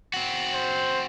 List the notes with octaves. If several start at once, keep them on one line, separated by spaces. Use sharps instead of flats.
C4 F#4
C5